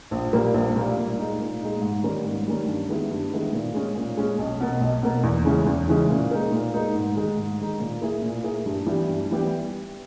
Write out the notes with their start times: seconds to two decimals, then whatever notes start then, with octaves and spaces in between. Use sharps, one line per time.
0.11 A#1
0.33 A#2 G3 A#3
0.54 A#1
0.76 A#2 G3 A#3
0.97 A#2
1.18 G#3 D#4
1.40 A#2
1.61 G#3 D#4
1.82 G#2
2.03 D#3 G3 A#3 C#4
2.24 G#2
2.47 D#3 G3 A#3 C#4
2.67 G2
2.89 D#3 G#3 B3 E4
3.11 G2
3.32 D#3 G#3 B3 E4
3.53 A#2
3.74 G#3 C#4
3.96 A#2
4.17 G#3 C#4
4.39 B1
4.60 B2 A#3
4.81 B1
5.03 B2 A#3
5.23 E2
5.45 C#3 E3 G#3 C#4
5.66 E2
5.88 C#3 E3 G#3 C#4
6.10 A#2
6.31 G#3 D#4 A#4
6.52 A#2
6.74 G#3 D#4 A#4
6.95 G#2
7.17 D#3 G#3 D#4
7.37 G#2
7.60 D#3 G#3 D#4
7.80 A#2
8.02 A#3 E4 G#4
8.22 A#2
8.44 A#3 E4 G#4
8.66 G2
8.86 E3 G3 B3 G4
9.08 G2
9.30 E3 G3 B3 G4